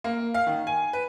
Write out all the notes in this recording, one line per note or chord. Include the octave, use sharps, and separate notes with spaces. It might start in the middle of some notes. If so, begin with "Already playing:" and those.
A#3
F5
D#3
G#5
B4